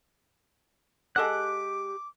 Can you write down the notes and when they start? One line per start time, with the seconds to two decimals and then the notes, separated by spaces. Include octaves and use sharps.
1.16 G#3 G4 A4 F#5 D6 F#6